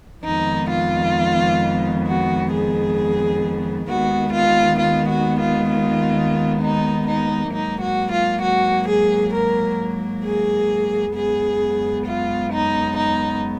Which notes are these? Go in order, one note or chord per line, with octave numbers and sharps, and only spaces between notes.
F2 D#3 G#3 B3 D#4
F4
F#4
G#4
D#2 D#3 G#3 B3 F#4
F4
F4
F#4
F4
F4
D#4
D#4
G#2 F#3 A#3 D#4
F#4
F4
F#4
G#4
A#4
G#4
F#2 C#3 G#3 B3 G#4
F4
D#4
D#4